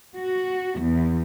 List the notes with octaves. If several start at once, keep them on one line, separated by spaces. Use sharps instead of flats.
F#4
E2